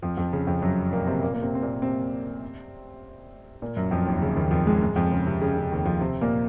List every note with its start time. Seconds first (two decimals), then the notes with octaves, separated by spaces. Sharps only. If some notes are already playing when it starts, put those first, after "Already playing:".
0.03 F2 F3
0.17 F2 F3
0.33 C#3
0.47 F2 F3
0.62 F#2 F#3
0.92 A#2 A#3
1.07 C3 C4
1.22 A#2 A#3
1.34 A#3
1.42 C3 C4
1.55 C4
1.62 A#2 A#3
1.82 C3 C4
3.62 A#2 A#3
3.77 F#2 F#3
3.91 F2 F3
4.07 D#2 D#3
4.22 C#3
4.37 D#2 D#3
4.51 F2 F3
4.66 G#2 G#3
4.82 G#2 G#3
4.96 F2 F3
5.11 C#3
5.26 C3
5.41 C#3
5.57 C#3
5.71 D#2 D#3
5.85 F2 F3
6.00 C3 C4
6.21 A#2 A#3